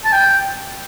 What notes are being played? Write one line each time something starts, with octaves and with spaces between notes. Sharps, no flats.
A5
G5